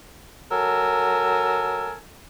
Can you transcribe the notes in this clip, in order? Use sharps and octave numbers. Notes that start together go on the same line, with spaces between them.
F#3 A4 A#4 G#5 E6